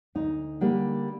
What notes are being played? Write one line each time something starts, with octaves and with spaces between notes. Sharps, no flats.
D2 D#4
D3 G3 A#3